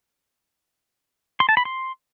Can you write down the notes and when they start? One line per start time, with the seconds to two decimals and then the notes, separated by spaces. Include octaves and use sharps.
1.40 C6
1.49 A5
1.57 B5
1.65 C6